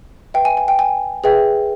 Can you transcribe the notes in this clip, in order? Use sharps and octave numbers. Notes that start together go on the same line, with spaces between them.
B4 E5 G5
G#5
G#5
G5
G#5
G#4 B4 E5 G5